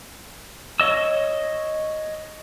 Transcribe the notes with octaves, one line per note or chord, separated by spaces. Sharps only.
C#5 D#5 E6